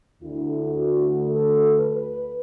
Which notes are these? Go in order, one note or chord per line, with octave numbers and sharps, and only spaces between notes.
D2 D3 E4
F#4
A4
B4